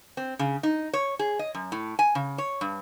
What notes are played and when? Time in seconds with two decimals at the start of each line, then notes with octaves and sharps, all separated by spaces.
0.17 C4
0.39 C#3
0.63 D#4
0.93 C#5
1.19 G#4
1.39 D#5
1.54 F#2
1.72 A2
1.99 G#5
2.15 C#3
2.38 C#5
2.61 G2